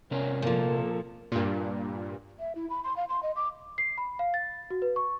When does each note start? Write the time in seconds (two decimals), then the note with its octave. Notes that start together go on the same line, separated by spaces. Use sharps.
0.11 C3 B3 C#4 A#4
0.42 A#2 F3 A#3 A4
1.32 G2 A#2
2.39 E5
2.55 E4
2.70 B5
2.84 C6
2.97 F5
3.09 C6
3.23 D#5
3.36 D6
3.78 C7
3.98 B5
4.19 F5
4.34 A6
4.70 F#4
4.82 B4
4.96 C#6